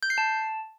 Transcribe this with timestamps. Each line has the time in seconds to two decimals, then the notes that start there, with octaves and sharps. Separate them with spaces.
0.03 G6
0.10 C7
0.18 A5